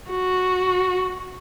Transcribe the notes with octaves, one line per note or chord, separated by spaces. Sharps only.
F#4